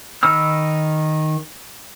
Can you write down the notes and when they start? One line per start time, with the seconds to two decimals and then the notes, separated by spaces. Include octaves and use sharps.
0.23 D#3 D#4 B5 E6 F6